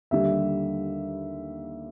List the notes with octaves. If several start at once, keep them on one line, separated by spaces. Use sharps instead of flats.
D#2 D3 G3 E5